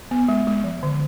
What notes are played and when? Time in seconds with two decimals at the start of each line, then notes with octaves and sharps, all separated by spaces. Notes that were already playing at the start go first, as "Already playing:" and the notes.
0.11 B3
0.29 G#3
0.47 G#3
0.64 F3
0.83 D3